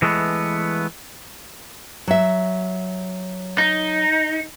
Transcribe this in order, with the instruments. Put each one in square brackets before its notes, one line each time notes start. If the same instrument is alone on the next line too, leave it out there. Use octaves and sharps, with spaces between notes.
[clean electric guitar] E3 G#3 A3 B3
[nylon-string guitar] F#3 E5
[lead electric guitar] D#4